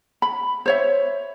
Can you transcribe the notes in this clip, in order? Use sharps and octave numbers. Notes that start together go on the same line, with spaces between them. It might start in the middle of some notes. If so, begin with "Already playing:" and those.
B5
C5 C#5 E5